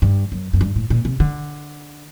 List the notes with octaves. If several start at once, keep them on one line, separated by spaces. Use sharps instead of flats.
G2
F#2
F#2
G2
A2
A#2
C3
D3